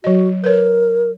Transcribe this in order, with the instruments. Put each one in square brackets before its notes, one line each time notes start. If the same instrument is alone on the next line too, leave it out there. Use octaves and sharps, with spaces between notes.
[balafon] F#3 D#5 [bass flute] F#4
[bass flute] A#4 [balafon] B4 C#5